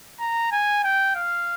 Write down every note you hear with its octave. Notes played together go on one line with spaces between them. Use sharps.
A#5
G#5
G5
F5